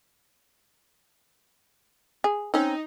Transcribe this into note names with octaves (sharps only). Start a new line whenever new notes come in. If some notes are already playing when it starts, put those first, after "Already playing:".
G#4
C4 C#4 D#4